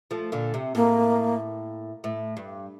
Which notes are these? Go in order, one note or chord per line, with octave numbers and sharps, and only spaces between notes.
F3 A3
A#2 D3
C3
A2 A#3
A2
G2